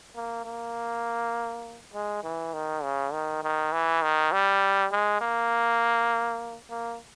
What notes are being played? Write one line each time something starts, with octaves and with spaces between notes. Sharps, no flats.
A#3
A#3
G#3
E3
D#3
C#3
D#3
D#3
E3
D#3
G3
G#3
A#3
A#3